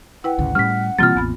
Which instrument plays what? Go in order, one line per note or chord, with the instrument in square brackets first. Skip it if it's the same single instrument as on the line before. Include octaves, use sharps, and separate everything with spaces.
[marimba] E4 B4 G5 [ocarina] F#5
[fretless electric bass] G#1 D2 C#3
[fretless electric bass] A2 G3 [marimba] C#4 [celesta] F6 B6
[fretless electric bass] B2 E3 G3 [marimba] A#3 C4 F4 [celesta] F6 A6
[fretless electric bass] A1 [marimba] E2 B3 B5